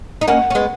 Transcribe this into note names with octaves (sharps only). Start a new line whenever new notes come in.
D#4
A#3 C#4 F#5
C#4
G#3 B3